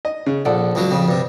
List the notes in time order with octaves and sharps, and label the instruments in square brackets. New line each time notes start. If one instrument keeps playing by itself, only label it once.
[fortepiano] D#5
C#3
[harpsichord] A#1 [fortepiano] A4 D5 F#5
[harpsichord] C#2 C#3 F#3
F2 C#3
G2 C3